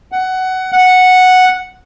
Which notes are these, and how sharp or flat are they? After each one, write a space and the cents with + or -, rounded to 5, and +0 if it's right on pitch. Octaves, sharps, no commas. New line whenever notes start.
F#5 +15
F#5 -5